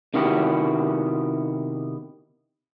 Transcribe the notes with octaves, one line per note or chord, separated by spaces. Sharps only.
C3 D#3 B3 E4 F#4 G4